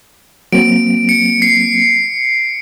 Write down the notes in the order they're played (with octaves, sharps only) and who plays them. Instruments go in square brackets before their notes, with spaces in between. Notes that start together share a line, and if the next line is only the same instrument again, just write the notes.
[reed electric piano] F#3 A#3 C4 [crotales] D7
[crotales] C#7
C7